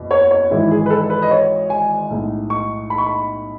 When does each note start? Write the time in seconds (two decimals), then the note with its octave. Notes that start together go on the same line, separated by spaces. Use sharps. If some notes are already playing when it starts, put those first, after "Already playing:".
Already playing: F#1 E2 B2
0.11 C#5
0.31 C#5
0.50 G#1 G#2 E3 G#3 E4
0.71 G#4
0.86 B4
0.90 A4
1.10 B4
1.22 D#5
1.31 C#5
1.70 G#5
2.10 B1 A2 G#3
2.50 C#6
2.90 B5
2.98 C#6
3.07 B5